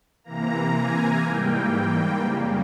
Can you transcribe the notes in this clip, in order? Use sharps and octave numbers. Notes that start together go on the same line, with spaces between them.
C3 E3 A#3 A#5
G#5
G#2 E3 G3 A#3 G5
F2 C#3 G3 A#3